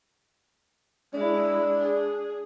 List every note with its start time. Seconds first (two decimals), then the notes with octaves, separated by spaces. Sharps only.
1.14 G#3 D4 E4
1.80 G#4